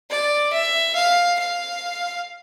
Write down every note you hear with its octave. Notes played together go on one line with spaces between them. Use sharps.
D5
E5
F5
F5